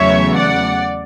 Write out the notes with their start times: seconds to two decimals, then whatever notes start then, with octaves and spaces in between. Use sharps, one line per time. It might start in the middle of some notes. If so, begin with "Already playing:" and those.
Already playing: E2 C#3 F#3 A3 C#5 E5
0.35 D5 F#5